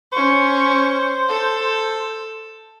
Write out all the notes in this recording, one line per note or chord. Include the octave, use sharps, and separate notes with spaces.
C#4 C5 C#6
A4